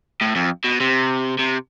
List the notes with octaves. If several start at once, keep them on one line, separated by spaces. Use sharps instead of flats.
A2
F2
B2
C3
C3